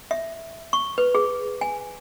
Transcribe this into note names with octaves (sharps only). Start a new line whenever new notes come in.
E5
C#6
B4
G#4
G#5